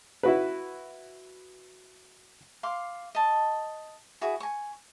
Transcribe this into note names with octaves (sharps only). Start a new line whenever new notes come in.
E4 F#4 B4
F5 C6 D6
D#5 A5
E4 F#4 G#4
G#5 C#6